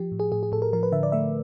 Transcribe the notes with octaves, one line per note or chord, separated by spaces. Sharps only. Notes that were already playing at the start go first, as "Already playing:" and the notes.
Already playing: F3 G4
A2
G#4
A2 G#4
G#4
A2 A4
A#4
F3 A#4
B4
D3 E5
D5
A3 E5